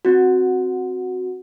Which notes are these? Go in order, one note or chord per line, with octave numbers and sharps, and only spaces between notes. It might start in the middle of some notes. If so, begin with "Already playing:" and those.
C4 F#4